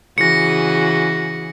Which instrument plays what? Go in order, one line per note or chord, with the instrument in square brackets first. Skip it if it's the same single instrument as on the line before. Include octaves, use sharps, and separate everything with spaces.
[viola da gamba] C#3 E3 F#4 [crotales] A#6 C#7